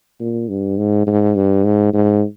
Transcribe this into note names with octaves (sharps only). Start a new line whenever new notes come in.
A#2
G2
G#2
G#2
G2
G#2
G#2